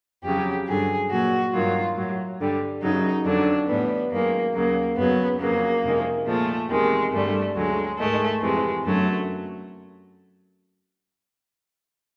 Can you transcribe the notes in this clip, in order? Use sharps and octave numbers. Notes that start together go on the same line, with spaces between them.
F2 C#3 F#3 G4
G2 D3 F#3 G#4
A#2 F#3 F#4
G2 D#3 F#3 F4
A2 F#3
G2 D3 G3
F#2 C#3 F#3 D#4
F2 D3 F#3 D4
A2 E3 G3 B3
F#2 D#3 G#3 A#3
D#2 C#3 F#3 A#3
F#2 C#3 F#3 B3
F2 C#3 F#3 A#3
F2 C3 D#3 G#3
A#2 F3 G#3 A3
E2 C3 D#3 G#3
G2 D3 G3 A3
D2 D3 F#3 G#3
G#2 D#3 G#3 A3
F2 C3 E3 G#3
F#2 D3 F#3 A3